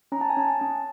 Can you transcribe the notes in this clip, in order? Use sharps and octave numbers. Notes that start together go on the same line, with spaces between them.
C#4 A#5
A5
G#5
C#4 A5
A5
C#4